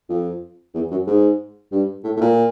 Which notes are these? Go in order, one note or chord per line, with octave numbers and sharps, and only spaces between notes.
F2
E2
F#2
G#2
G2
A2
A2
A#2